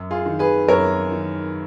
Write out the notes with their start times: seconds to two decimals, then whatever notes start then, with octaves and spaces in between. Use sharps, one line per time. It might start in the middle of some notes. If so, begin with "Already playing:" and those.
Already playing: F#2
0.11 F4 G#4
0.26 D#3
0.39 G#4 B4
0.68 F#2 A#4 C#5
1.12 D#3